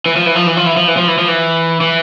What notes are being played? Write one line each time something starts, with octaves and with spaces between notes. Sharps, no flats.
E3
F3
E3
F3
E3
F3
E3
F3
E3
F3
E3
F3
E3
E3